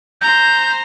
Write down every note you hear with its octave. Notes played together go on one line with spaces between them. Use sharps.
C5 A#5 G6